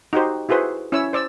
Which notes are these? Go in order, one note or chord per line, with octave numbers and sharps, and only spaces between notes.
D#4 F#4 G4 C5
E4 F#4 G#4 B4 C5
C#4 E4 C#5 E6
C5 D5 E6